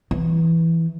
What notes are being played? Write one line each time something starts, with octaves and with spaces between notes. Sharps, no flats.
E3